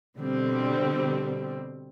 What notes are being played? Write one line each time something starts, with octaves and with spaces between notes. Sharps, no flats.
B2 D3 G3 C4